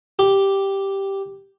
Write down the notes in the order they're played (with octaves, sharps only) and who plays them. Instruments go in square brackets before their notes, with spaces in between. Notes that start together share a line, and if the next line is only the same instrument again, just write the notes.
[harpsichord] G4